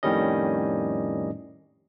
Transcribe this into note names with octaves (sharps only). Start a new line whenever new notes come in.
F2 A2 D#3 G3 C#4 D#5